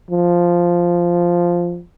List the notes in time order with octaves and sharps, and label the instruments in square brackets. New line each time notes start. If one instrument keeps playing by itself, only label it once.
[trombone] F3